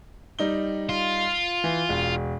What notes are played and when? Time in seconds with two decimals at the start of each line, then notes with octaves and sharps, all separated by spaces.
0.39 G3 D#4 G7
0.89 F4
1.64 E3
1.89 E1